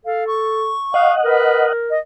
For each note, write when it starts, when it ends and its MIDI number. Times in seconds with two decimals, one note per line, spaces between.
0.05 0.73 69
0.05 0.24 77
0.27 1.13 85
0.94 1.73 75
0.94 1.14 77
0.94 1.73 78
1.25 1.97 70
1.25 1.65 71
1.90 1.98 75